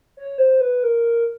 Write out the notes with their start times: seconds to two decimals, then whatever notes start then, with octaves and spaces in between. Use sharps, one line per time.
0.17 C#5
0.38 C5
0.61 B4
0.83 A#4